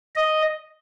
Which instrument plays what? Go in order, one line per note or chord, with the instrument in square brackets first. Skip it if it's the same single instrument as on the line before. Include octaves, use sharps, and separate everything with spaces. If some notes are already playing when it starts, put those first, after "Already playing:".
[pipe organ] D#5